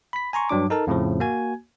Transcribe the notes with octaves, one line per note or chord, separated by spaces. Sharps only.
B5 B6
G#5 A#5 C6 C#6
G2 F#3 D4 D6
D#4 A4 A#4 A5
F2 A2 C#3 F3
A#3 F#4 G#5 G#6